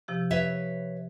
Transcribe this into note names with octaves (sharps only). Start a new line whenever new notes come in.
C3 F3 G4
B4 C#5 E5